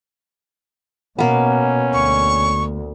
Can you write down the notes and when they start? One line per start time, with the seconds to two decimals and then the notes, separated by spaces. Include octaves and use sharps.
1.19 B2 A#3 B3 C#4
1.94 D2 C#6